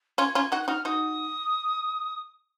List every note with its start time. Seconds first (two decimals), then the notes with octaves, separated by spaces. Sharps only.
0.18 C#4 F4 G#6
0.35 C#4 F4 G#6
0.52 D#4 F#4 F#6
0.63 F#6
0.68 D#4 F#4 F6
0.85 D#4 F#4 D#6